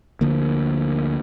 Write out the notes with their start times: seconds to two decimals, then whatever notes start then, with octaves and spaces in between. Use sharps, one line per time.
0.21 D2 D3 F3 A#3